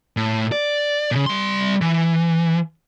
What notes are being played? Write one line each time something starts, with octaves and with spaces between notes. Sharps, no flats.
A2
D5
A#2 C#3
G3 C6
E3